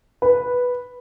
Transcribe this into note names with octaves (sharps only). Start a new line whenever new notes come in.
B4